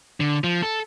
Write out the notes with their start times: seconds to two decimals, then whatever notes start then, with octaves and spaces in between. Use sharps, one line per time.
0.20 D3
0.44 F3
0.63 A4